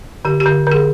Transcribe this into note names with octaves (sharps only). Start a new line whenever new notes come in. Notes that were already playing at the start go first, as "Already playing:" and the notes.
D3 G4
G4
D3
D3 G#4